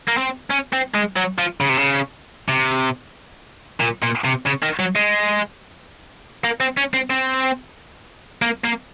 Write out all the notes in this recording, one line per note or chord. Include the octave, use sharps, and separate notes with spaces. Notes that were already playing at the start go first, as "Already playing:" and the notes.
A#3
C4
C#4
C4
G#3
F#3
F3
C#3
C3
C#3
C3
A#2
A#2
C3
C#3
D#3
F#3
G#3
A#3
C4
C#4
C4
C4
A#3
A#3